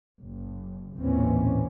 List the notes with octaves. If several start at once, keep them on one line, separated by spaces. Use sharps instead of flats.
F#1
A1 D#2 A#2 E3 C4 C#4